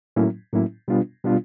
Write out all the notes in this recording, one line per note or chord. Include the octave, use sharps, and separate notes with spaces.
A2 F#3 A#3 C#4 E4
A2 F#3 A#3 C#4 E4
B2 G3 B3 D4 F4
B2 G3 B3 D4 F4